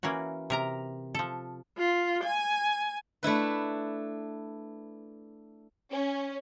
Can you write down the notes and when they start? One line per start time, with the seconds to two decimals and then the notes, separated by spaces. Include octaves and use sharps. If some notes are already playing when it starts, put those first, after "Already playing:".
0.03 E3 A#3 C#4 F#4
0.50 C3 A#4 A#5
1.15 F3 A4
1.77 F4
2.23 G#5
3.23 A3 D4 E4 B4
5.91 C#4